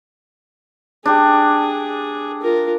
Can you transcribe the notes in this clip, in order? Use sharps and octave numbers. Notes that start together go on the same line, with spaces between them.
D4 G4 G#4
F4 A#4